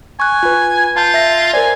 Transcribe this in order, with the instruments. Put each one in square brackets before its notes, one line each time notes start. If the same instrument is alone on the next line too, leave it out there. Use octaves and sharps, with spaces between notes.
[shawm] G#5 [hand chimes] C#6 F#6
[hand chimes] F4 B4
[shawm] F4 [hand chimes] A5 G6
[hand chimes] E5 A#6
[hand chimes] A#4 C5 D5 [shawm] G#5